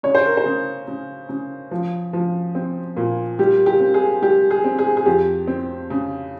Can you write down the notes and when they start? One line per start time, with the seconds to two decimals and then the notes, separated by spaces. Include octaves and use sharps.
0.03 C#3 C#5
0.15 C5
0.26 A#4
0.37 C5
0.46 C#3
0.88 C#3
1.29 C#3
1.71 F3
2.13 F3
2.55 C4
2.97 A#2
3.39 G3 G4
3.66 G4
3.80 C4
3.94 G#4
4.22 G3 G4
4.51 G#4
4.64 C4
4.79 G#4
4.97 G#4
5.06 F2 G4
5.48 C4
5.90 C#3